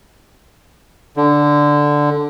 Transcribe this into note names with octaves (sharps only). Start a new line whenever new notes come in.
D3